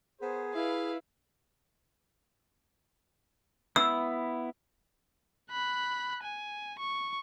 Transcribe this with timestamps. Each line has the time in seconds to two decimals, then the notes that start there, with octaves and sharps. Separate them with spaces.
0.20 B3 G#4 A#4 C5
0.54 E4 B4 F5
3.76 B3 E4 E6
5.51 B5 F#6
6.23 G#5
6.79 C#6